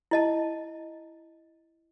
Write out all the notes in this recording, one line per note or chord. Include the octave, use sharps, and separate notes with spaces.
E4 D#5 A5